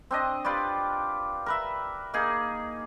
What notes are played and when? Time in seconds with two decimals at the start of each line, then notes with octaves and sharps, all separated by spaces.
0.11 C4 D4 D#5
0.45 F4 G4 B4 D5
1.46 A#4 B4 E5
2.14 A#3 D#4 G#4